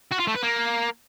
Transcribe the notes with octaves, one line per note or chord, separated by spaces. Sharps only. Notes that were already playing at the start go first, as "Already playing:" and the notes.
F#4
F4
A3
B4
A#3